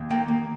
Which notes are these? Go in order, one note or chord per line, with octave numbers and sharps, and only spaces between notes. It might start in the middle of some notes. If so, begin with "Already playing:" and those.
Already playing: D#2
A#3 G5
A#3